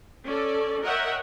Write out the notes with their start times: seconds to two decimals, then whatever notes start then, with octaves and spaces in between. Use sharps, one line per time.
0.24 C#4 A4 D5
0.83 A#4 C#5 D#5 E5 F#5 G5